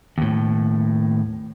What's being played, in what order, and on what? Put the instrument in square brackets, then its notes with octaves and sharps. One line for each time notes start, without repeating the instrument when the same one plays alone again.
[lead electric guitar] D#2 A2